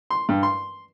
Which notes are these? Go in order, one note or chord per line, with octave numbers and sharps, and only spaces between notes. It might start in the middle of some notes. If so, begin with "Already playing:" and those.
C6
G2
C6